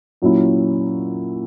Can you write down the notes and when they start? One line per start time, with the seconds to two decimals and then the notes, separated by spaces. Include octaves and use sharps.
0.22 A#2 F#3 C#4 E4